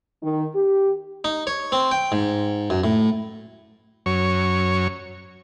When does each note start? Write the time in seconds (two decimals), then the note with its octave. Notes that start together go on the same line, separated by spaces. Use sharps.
0.22 D#3
0.55 G4
1.24 D#4
1.47 C#5
1.72 C4
1.91 G5
2.12 G#2
2.70 F#2
2.84 A2
4.06 F#2 C#5